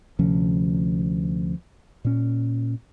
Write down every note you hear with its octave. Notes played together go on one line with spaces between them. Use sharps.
D2 C3 F3 C#4
A#2 C#4